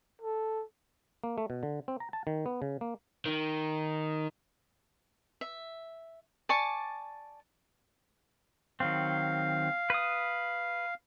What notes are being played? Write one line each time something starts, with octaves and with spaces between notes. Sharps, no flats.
A4
A#3
A3
B2
D3
C4
A#5
A5
D#3
B3
C#3
A#3
D#3
E5
D5 G#5 A5 C#6
D#3 F#3 C4 F5
B4 D#6